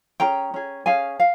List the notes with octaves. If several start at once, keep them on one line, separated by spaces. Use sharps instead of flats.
C#4 G#4 G5 A#5
C#4 G#4
C#4 G#4 F5 G#5
F5